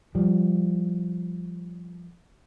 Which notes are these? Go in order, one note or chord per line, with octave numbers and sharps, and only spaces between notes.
F3 G3